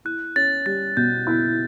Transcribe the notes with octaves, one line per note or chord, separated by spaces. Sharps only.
E4 F#6
C#4 A6
G3 A6
B2 G6
E4